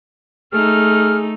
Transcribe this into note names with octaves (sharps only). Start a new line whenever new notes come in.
A3 D#4 G#4 F6